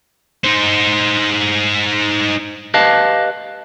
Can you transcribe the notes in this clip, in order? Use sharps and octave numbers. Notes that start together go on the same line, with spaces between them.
D#4 C5
G4 B4 D#5 F5 A5